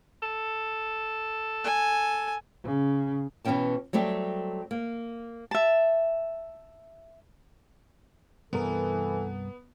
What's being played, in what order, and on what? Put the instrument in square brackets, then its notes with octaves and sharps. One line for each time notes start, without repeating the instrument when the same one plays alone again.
[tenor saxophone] A4
[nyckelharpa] G#5
[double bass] C#3
[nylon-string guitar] B2 E3 B3 C#4 G5 A5
F#3 G3 A3 C4 G4
A#3
[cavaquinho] E5 A5
[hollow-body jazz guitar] C2 G2 A#4 [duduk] E3 [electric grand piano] B3 [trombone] A4